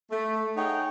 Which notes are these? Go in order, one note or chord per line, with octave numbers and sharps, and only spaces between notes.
A3
D#4 G#4 C#5 F#5 G5